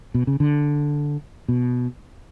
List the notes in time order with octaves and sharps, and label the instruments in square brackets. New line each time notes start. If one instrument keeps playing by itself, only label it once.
[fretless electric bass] B2
C#3
D3
B2